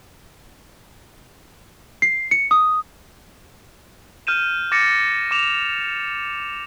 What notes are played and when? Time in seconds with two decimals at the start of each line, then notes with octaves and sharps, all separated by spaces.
2.02 C7
2.31 C#7
2.51 D#6
4.27 F6 G6 D#7 E7
4.72 D6 A6 A#6 C#7 D#7
5.31 D6 E7 F7